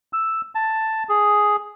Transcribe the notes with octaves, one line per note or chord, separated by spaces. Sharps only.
E6
A5
G#4